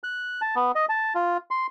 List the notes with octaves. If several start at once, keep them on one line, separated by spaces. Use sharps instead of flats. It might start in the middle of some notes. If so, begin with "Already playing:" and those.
F#6
A5
B3
D#5
A5
F4
C6